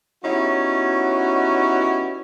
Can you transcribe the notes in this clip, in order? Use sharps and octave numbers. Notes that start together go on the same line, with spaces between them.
G3 B3 C#4 D#4 E4 F#4